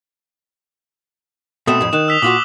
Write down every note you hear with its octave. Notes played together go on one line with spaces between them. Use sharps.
B2 A3 C4 D#6 E7
F2 A2
D#3 F#6 E7
E6 B6 F7
A#2 F4 F#4 D6 B6 F#7